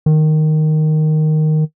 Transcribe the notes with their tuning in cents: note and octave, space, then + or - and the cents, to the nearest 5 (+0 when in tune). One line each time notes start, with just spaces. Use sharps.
D#3 -5